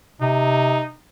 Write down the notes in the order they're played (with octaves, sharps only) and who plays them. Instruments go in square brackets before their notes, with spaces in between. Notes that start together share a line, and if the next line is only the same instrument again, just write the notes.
[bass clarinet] C3 [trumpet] D#4